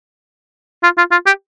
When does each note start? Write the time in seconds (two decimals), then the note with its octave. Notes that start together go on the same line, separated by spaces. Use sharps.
0.83 F4
0.98 F4
1.11 F4
1.26 G4